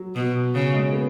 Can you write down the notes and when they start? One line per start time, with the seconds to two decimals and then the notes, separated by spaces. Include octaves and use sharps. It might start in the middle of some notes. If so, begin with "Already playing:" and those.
Already playing: F#3
0.15 B2
0.55 C#3
0.74 G#3
0.93 B3